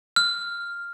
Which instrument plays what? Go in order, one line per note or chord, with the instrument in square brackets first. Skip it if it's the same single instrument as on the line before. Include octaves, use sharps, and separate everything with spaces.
[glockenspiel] F6